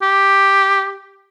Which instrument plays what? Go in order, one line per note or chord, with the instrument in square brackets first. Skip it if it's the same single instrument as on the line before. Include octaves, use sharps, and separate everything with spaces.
[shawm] G4